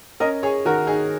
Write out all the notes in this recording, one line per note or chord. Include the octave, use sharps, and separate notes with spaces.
C#4 A#4 D#5
G#4 C#5
D#3 F#4 A#4
D#4 G#4